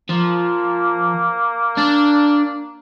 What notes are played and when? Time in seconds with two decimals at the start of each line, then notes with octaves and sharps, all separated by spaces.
0.10 F3 A#3
1.77 D4